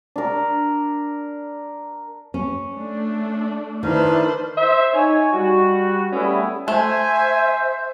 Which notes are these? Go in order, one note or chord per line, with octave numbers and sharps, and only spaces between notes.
D4 A#4
C#4
A3 D4
D#3 D4 E4 B4 C5 F6
C5 E5
D#4 C#5 G#5
G3 F#4
G3 A3 B3 C#4 E4 G#4
A3 C5 E5 G#5